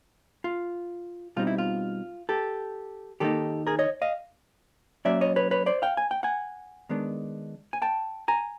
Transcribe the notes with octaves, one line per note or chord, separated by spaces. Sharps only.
F4
B2 G3 C4 D#4 F4
E4
F4
G4 A4
D#3 G3 A#3 D#4 G4 A4
G#4 A#4
C#5 D#5
D#5 F5
F#3 A#3 C#4 D5 E5
C#5 D#5
B4 C#5
B4 C#5
C5 D5
F5 G5
G#5
G5
F#5 G#5
D#3 G#3 B3 D4
G#5
G5 A5
G#5 A#5